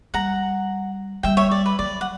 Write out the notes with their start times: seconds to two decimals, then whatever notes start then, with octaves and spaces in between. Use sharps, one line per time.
0.14 G3 F#5 A#5
1.23 G3 E5 G5
1.37 C#5 E5
1.51 D5
1.66 B4
1.79 F#3 D5
2.01 F#5